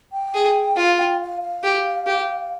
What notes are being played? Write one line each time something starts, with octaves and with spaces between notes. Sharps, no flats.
G5
G#4
F4 F5
G5
F5
F5
G4
G4